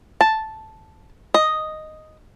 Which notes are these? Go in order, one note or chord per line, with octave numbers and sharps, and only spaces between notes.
A5
D#5